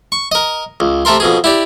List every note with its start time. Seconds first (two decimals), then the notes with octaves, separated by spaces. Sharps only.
0.12 C#6
0.32 A#4 D#5
0.80 C#2
1.05 C3 A3 A4 A#4 C6
1.20 F2 B2 G#4
1.44 E4 G4 D5